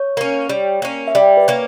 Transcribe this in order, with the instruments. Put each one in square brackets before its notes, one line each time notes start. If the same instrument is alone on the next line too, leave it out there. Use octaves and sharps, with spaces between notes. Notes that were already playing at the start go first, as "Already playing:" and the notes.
Already playing: [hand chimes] C#5
[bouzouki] A#3 C#4
G3
A#3 C#4
[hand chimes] E5
[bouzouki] G3 [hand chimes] D5
[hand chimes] B4
[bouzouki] A#3 C#4